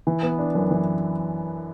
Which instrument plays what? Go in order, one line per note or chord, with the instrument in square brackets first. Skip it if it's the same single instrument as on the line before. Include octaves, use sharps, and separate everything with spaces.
[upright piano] E3
B3
D4
F#2
E3